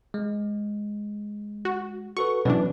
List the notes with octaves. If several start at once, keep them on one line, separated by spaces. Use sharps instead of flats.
G#3
F#4
F#4 A4 B4 C#6
B2 E3 F#3 C#4 D4 B4